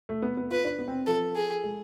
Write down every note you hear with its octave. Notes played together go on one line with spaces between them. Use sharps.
A3
B3
B3
F4 B4
D4
B3
C4
F3 A4
G#4
G#3